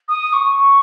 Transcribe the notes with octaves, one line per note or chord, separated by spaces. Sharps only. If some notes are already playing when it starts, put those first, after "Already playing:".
D#6
C#6